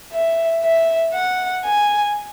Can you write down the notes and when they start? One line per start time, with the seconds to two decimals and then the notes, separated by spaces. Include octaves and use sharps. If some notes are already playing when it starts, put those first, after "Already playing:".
0.13 E5
0.64 E5
1.14 F#5
1.66 G#5